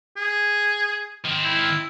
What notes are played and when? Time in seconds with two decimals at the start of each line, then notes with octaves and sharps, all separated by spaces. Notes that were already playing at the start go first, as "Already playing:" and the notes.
0.17 G#4
1.25 D#3 C4
1.44 E4